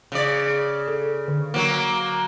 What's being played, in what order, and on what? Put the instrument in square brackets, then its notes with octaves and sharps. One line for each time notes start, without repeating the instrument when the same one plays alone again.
[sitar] C#3 D5
[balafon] A4
D3
[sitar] F#3 A#3